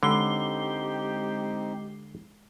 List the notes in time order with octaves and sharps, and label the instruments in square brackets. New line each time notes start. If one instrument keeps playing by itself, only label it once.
[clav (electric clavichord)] D3 [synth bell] G#3 C7 G7 [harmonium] C4 D#4 [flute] G4